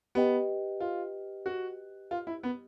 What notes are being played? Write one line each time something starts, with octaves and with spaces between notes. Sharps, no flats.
B3 G4 B4 D#5 G5
F4
F#4
F4
E4
B3